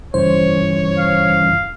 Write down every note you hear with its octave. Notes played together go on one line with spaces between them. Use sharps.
G2 C#3 E3 C5 C#5
F5